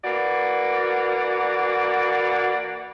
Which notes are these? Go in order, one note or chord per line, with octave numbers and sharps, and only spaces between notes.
E3 A#3 F#4 D5